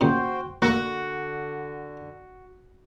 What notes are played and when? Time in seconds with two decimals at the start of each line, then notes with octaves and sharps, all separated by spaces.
0.01 A#2 C#3 F#4 C5 G5
0.62 D3 A#3 F#4 A4